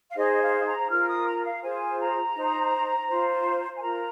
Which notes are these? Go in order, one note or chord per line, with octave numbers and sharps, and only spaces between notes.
F5
D#4 G#4 C5 D#5
F5
A#5
F4 A#4 F6
D#6
A#5
F5
F4 G#4 C5 G#5
A#5
D#4 C5
F4 C5
G#5
F4 A#4 A#5